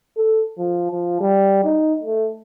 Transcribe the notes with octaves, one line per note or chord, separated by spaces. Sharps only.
A4
F3
F3
G3
D#4
A3